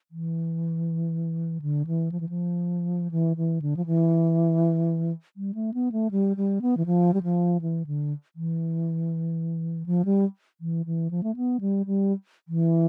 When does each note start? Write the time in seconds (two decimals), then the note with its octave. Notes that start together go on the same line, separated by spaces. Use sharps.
0.11 E3
1.62 D3
1.87 E3
2.12 F3
2.20 E3
2.29 F3
3.11 E3
3.37 E3
3.62 D3
3.77 F3
3.86 E3
5.37 G3
5.55 A3
5.74 B3
5.92 A3
6.11 G3
6.37 G3
6.62 B3
6.77 E3
6.86 F3
7.14 G3
7.23 F3
7.61 E3
7.87 D3
8.36 E3
9.86 F3
10.05 G3
10.61 E3
10.86 E3
11.11 F3
11.23 A3
11.36 B3
11.61 G3
11.86 G3
12.48 E3